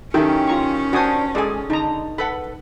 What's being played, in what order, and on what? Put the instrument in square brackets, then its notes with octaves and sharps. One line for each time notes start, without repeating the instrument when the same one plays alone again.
[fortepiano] D#3 [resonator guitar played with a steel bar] F#3 E4 G4 [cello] C#4 [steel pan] A4
[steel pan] F4 A#5 C#6
[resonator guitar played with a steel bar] D4 C5 [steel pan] F#4 G#5 D#6
[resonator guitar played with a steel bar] G#3 G#5 [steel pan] G#4 A4 D5
[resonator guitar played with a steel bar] D3 [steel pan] D#4 A#5
[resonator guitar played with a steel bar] A4 B4 F#5 [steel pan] B5